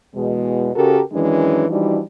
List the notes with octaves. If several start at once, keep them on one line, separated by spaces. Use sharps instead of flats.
E2 B2 G#3
C#3 F#4 G4 A4 A#4
F#2 D#3 E3 G#3 C#4 D4
E3 F3 G3 D4 D#4 F#4